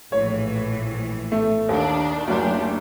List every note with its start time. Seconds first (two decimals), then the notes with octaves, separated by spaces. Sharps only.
0.12 A#1 A2 E3 C#5
1.32 A3
1.69 D#2 D#3 D4
2.27 F#1 D2 D4 G4